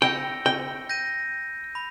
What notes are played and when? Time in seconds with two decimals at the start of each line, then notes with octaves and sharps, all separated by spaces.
0.02 G5 B5 E6 G6 A#6 C#7
0.46 G5
0.89 G6 A#6 D#7
1.75 B5